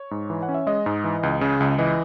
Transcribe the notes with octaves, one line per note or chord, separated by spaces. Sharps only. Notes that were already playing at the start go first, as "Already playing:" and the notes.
Already playing: C#5
G#2
E3
F#5
C#4
E5
G#3 D#5
G#2
E3
C#2
C#3
C#2
E3 D#5